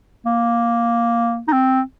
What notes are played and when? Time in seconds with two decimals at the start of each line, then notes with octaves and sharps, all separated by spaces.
0.26 A#3
1.48 D#4
1.52 C4